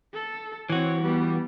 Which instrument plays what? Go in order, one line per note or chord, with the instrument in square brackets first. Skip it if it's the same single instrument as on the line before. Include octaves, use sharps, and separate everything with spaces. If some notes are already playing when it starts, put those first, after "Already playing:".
[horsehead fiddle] A4
[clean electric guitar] E3 F#4 [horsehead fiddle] C4 C#5
[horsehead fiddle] G3 B3